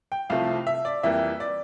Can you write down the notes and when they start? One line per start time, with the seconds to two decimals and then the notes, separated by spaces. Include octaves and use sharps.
0.12 G5
0.30 C2 C3 F3 A3 F5
0.67 E5
0.85 D5
1.03 F2 E3 G3 A#3 E5
1.40 D5